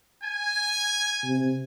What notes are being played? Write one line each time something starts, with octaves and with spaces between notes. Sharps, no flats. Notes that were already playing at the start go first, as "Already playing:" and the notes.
G#5
C3